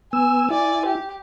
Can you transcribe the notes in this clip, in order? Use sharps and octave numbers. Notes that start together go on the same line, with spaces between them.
B3 G#5 E6
E4 D5 G#5
G4